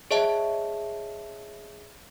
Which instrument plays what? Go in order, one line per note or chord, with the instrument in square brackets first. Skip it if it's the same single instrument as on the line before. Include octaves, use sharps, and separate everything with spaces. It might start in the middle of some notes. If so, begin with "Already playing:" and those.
[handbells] G#4 C#5 D#5 E5 A5